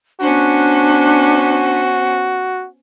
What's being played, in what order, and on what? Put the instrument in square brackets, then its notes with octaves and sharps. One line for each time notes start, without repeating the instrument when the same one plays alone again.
[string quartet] B3 C#4 C5 [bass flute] D4 [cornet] F#4